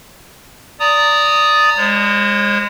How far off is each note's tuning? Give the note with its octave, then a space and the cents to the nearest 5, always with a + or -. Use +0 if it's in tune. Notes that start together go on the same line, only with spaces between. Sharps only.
D5 -15 A#5 -25 D#6 +0
G#3 -25 C5 +45